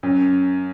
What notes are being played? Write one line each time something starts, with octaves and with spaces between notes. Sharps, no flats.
F#2